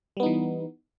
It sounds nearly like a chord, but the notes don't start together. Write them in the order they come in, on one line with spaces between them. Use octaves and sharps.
G3 B3 D#4 E3